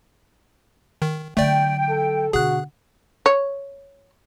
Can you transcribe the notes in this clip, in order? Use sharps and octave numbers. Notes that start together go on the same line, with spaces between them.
D#3
D3 F#3 A3 D5 G5
A4
B2 D3 F#4 G#4 F#6
C#5